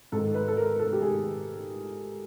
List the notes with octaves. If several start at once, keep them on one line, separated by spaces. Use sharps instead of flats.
G#2 D#3 A4
B4
A4
A#4
A4
G4
G#2 D#3 G#4